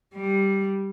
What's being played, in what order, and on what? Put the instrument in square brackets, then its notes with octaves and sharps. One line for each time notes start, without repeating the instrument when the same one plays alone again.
[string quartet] G3